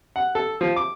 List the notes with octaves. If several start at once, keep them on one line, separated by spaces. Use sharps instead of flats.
F#5
A4
F3
D6